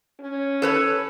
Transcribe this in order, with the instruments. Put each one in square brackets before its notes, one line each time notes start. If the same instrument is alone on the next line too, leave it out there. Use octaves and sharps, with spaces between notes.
[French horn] C#4
[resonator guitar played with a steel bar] A4 B4 C#5